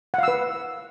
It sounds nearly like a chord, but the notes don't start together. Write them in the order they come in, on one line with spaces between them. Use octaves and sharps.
F#5 F5 E6 B4